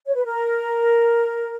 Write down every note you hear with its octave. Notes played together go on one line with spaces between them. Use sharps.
C#5
B4
A#4